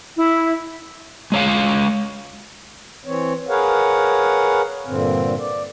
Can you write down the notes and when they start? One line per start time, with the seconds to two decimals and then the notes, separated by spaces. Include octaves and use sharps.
0.16 E4
1.32 G#3 C#5 F5
3.06 E3 C4 C#5
3.49 G#4 A#4 B4 C#5 F5 F#5
4.87 G2 A#2 D3 C4
5.38 D5